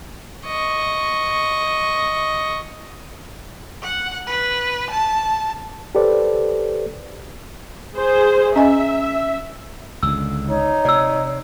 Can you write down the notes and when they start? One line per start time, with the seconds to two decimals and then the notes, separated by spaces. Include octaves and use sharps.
0.46 D#5 C#6
3.82 F#5
4.26 B4
4.90 A5
5.95 G4 A4 B4 C5 D5
7.96 G#4 C5
8.56 C#4 D#5 E5 G#5
10.03 C#2 D3 E6
10.49 D#4 C#5
10.85 C3 D5 E6